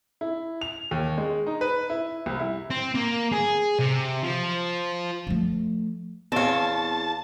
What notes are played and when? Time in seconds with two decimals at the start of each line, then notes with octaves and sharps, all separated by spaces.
0.21 E4
0.61 F7
0.91 D#2
1.18 G#3
1.47 D#4
1.61 B4
1.90 E4
2.26 C2
2.40 E4
2.70 C4
2.95 A#3
3.32 G#4
3.79 C3
4.23 F3
5.27 F3 A3
6.32 E2 C4 C#5 F5 A5